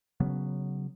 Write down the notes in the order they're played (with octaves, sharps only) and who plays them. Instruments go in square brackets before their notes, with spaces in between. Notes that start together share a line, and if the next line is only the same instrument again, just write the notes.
[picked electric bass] C#3 F#3 B3